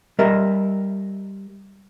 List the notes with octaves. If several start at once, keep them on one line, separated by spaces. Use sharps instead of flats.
G3 A#4 D#5 E5